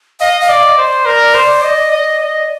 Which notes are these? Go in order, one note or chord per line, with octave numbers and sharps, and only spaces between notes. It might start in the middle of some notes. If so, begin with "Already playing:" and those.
D#5 F5
F5
D5
D#5
C5
D5
A#4
C5
D#5
D#5
D#5